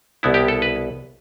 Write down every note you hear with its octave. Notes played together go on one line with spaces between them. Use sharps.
C2 B2 B3 E4
G4
A4
B4